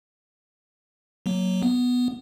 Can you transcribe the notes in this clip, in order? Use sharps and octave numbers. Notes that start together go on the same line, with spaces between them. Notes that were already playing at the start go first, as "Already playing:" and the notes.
F#3 A#3
B3